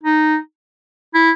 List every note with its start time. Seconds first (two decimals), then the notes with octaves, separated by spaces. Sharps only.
0.03 D#4
1.15 E4